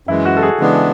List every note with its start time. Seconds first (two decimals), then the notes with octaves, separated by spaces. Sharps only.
0.07 F#2 E3 G#3 E4
0.25 F#4
0.37 A4
0.42 G#4
0.59 C#3 E3 G#3 B3 D4